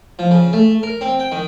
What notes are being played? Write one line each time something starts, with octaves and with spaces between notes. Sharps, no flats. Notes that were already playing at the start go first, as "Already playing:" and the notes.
F3
C#3
A3
A#4
C4
G5
D#3